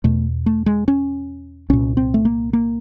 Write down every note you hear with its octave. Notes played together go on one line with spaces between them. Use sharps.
E2 B2 A3
A3
G#3
C#4
C2 A#2 C#4
C4
A3
A#3
A#3